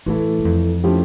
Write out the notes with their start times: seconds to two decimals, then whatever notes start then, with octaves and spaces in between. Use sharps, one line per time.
0.06 A2 E3 A3 E4
0.39 G2
0.45 F2
0.84 F3 A3 C#4 E4 G4